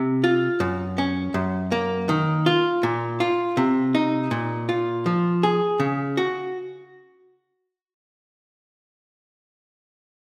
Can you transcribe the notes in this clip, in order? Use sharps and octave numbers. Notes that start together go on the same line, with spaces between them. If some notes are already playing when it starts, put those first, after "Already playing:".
Already playing: C3
F4
F#2
C#4
F#2
A#3
D#3
F4
A#2
F4
C3
D#4
A#2
F4
F3
G#4
C#3
F#4